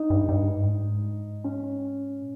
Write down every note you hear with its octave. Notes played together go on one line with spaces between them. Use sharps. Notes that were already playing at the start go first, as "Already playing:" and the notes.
Already playing: D#4
G2
G2
G#2
G2
G#2
C#4
A#2